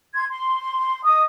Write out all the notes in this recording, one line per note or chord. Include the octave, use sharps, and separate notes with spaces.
C6 G#6
C6
D#5 D#6